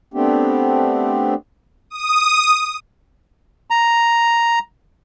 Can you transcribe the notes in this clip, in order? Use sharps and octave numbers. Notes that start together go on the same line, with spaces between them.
A3 B3 C4 D4 G4
D#6
A#5